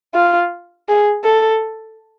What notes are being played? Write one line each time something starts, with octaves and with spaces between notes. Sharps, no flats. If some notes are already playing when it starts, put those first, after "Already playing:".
F4
G#4
A4